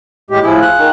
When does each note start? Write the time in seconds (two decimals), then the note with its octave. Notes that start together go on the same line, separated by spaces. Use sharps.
0.31 A2 G#3 G4
0.44 A2 F3 E4 F4 G#4
0.61 F#6
0.79 D#3